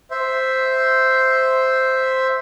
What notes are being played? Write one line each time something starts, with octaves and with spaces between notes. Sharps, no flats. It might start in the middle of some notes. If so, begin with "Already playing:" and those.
C5 E5